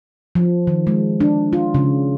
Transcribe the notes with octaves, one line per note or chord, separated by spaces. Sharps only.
F3
D#3
G#3
D4
F4
C#3